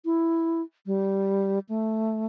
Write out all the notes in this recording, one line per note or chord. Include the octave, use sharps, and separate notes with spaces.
E4
G3
A3